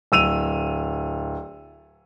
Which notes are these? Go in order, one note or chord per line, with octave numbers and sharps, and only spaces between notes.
D1 E6 D#7 F7